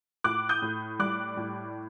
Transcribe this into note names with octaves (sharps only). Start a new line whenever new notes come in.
A2 D6 F#6
D#6 G6
A2
G3 D6 F#6
A2